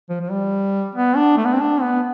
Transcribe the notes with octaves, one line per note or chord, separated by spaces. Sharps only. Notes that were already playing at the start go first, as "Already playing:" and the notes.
F3
F3
G3
B3
D4
A3
B3
C4
D4
B3